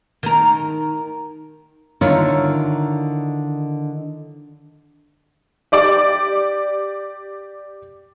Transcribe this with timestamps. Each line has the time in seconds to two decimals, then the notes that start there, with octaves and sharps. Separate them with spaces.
0.23 D#3 A#4
2.01 D3 D#3 E4 F4 A#4 C#5
5.72 G4 D5 D6